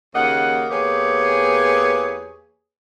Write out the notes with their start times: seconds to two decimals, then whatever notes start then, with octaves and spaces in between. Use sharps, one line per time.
0.14 D#2 C#3 A#3 D#5 F#5
0.71 E2 A#3 G4 G#4 B4 C#5